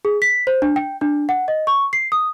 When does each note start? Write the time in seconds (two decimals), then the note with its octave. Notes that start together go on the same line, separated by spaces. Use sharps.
0.05 G#4
0.22 B6
0.47 C5
0.62 D4
0.76 G5
1.01 D4
1.29 F#5
1.48 D#5
1.67 C#6
1.93 C7
2.12 D#6